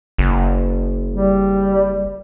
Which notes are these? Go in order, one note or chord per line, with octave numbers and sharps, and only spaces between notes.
F#1
G3